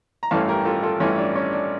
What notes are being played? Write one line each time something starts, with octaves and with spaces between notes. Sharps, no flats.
A#5
A1 G2 E3 A3 C#4 F5 A5
G4 A#4
F4 A4
F4 A4
A1 G2 E3 A3 C#4
D4
C#4
D4